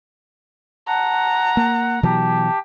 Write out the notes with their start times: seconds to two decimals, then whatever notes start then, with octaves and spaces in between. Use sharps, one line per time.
0.88 F#5 A5 A#5
1.57 A#3
2.03 B2 E3 F#3 G4 A5